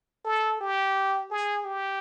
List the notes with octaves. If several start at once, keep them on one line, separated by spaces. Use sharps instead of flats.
A4
G4
G#4
G4